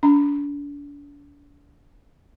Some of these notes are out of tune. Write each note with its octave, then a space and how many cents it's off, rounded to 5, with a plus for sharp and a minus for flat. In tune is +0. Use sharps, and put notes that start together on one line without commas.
D4 -35 A#5 +0